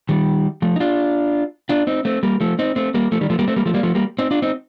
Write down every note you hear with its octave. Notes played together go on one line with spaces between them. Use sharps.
D#3 G3
F3 A3
D#4
D4 F4
D4 F4
C4 D#4
A3 C4
G3 A#3
F3 A3
C4 D#4
A3 C4
G3 A#3
F3 A3
D#3 G3
F3 A3
G3 A#3
A3 C4
G3 A#3
F3 A3
G3 A#3
F3 A3
G3 A#3
C4 D#4
D4 F4
C4 D#4